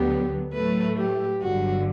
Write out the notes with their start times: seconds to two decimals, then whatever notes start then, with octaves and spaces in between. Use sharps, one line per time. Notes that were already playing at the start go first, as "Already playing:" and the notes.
Already playing: D2 D3 F#3 B3 G4
0.54 A2 F#3 A3 B4
0.98 G4
1.42 G1 G2 D3 F#3 F#4